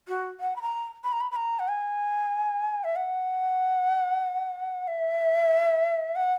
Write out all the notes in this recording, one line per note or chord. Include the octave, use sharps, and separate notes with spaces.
F#4
F#5
B5
A#5
B5
A#5
B5
B5
A#5
F#5
G#5
E5
F#5
E5
F#5